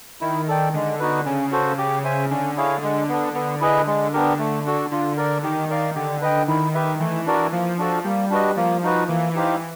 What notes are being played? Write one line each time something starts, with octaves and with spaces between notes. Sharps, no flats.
D#3 E4
A4 D5 G5
D3 G#3
B3 D#4 F#4 B4
C#3 C#4
F#4 A4 C5
C#3 G4
C5 E5 G#5
D3 C#4
E4 G#4 C#5 F5
D3 G#3
B3 D4
D3 B3
E4 G#4 B4 D#5
G#3
B3 D4 G4 A#4
A3
D4 F#4 A4
D3 F4
A#4 D5
D#3 G4
A#4 D5 F5
D3 G4
B4 D#5 G5
D#3 E4
G4 B4 E5
E3 A3
D4 F#4 A#4 D5
F3 A#3
D4 F#4 A4 D5
G3 A#3
D4 F#4 B4 D#5
F3 A#3
D#4 F#4 B4
E3 A#3
D#4 G4 C5 F5